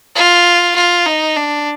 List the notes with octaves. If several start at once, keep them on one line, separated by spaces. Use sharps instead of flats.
F4
F4
D#4
D4